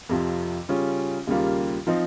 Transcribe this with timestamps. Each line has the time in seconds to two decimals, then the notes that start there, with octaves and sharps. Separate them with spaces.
0.09 F2 C3 F3
0.69 C#3 G3 C#4 F4
1.27 D#2 C#3 G3 A#3 F4
1.87 F3 C4 D#4